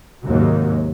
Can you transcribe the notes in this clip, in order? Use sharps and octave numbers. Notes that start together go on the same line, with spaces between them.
D#2 G#2 C3 F#3